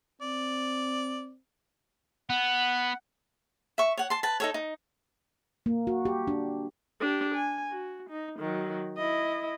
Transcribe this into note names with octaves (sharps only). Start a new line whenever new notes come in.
C4 D5
B3 F#5
E5 C#6
C#5 F#5
A5 C6
B4 A5
D#4 A4 C#5
D#4
A#3
F#4
G4
D4
D4 G4
G#5
F#4
D#4
D#3 F#3
E4 D#5